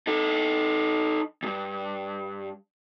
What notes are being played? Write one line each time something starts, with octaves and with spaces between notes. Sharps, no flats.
D#4 A4
E2 G2